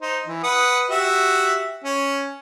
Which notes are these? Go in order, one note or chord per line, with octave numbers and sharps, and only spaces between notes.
D#4 C5
E3
B4 F#5 D#6
F#4 G4 E5
C#4